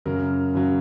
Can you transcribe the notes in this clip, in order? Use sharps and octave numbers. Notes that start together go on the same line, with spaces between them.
F#2 C#3 F#3 A#4
F#2 C#3 F#3